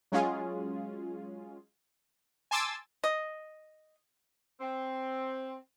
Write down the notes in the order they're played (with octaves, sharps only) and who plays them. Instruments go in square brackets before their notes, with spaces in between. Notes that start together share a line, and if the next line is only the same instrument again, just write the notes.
[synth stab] F#3 G#3 C#4 F4 G#4
G#5 A5 C6 D6 E6 A6
[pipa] D#5
[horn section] C4